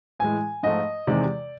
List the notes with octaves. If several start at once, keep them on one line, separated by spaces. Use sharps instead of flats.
A2 E3 G#3 G#5
G#2 F3 A3 D#5
E2 C3 D#3 G#3 D5